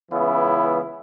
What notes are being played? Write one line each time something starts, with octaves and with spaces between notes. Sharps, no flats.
C#2 C#3 E3 B3 E4